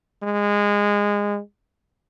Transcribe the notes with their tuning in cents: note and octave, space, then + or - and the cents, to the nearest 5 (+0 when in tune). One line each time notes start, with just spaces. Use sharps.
G#3 -20